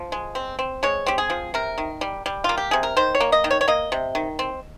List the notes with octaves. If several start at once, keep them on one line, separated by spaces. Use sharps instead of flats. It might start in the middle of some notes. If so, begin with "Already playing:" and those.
Already playing: F3
G#3
C4
C4
G#3 C#5
C4 G4
G#4
F3
C3 A#4
D#3
G3
G3
A#3 F4
G4
C3 G#4
A#4
D#3 C5
C#5
A#3
D#5
D#3
C#5
C#5
A#3 D#5
C3
D#3
C4